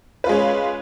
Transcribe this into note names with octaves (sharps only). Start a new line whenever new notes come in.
G#3 C#4 F4 B4